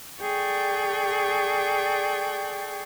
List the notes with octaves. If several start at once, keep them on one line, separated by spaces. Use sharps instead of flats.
G#4 A4 D5 G5 C#6